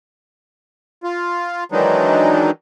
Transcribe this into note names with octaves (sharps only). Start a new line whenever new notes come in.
F4
D#3 E3 F#3 G#3 D4 D#4